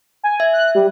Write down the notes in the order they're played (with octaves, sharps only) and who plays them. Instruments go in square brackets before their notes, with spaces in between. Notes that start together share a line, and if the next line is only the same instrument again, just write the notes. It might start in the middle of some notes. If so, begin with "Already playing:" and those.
[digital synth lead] G#5
[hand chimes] E5
[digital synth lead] F#6
G3